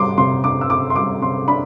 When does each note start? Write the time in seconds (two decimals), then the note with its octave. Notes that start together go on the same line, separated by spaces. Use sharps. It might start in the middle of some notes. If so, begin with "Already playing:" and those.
Already playing: C3 G3 C6 D6
0.18 C3 C6
0.44 D4 D6
0.61 E6
0.70 C3 D6
0.90 C6
0.96 G3 D6
1.22 C3 C6
1.48 D4 B5